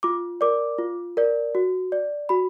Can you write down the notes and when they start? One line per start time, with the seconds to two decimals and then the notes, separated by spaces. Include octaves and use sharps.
0.03 F4 D6
0.41 A#4 D5 D6
0.78 F4
1.17 A#4 D5
1.55 F#4
1.92 D5
2.29 F#4 B5